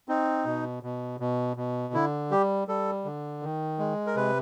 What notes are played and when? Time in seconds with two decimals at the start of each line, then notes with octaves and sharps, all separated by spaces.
0.09 C4 D#4
0.46 B2
0.83 B2
1.20 B2
1.57 B2
1.94 D3 E4
2.31 G3 G4
2.68 G3 A4
3.05 D3
3.43 D#3
3.79 G#3
4.07 A#4
4.16 C3 B4